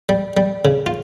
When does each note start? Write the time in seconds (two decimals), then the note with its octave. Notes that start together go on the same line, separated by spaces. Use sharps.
0.09 G3
0.37 G3
0.65 C#3
0.86 F4